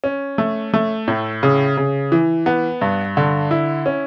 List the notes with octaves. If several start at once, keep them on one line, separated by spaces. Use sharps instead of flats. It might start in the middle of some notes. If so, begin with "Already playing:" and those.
C#4
A3
A3
A2
C#3
C#3
E3
B3
G2
D3
E4
C#4